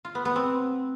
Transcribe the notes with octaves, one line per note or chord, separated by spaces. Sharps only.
F4
B3
B3
C4